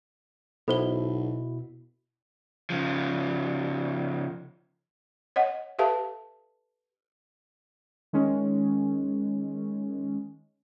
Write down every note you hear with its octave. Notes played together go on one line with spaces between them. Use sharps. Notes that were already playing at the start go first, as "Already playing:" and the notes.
B1 B2 E4 A4 C5 G7
C#3 F3
C#5 D#5 F#5
G4 A4 B4 E5 F5 A5
D#3 G#3 C#4